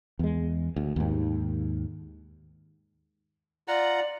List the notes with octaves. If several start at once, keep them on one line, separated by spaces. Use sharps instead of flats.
E2 G#3
D2
D#2 G#2
F4 D5 F#5 A#5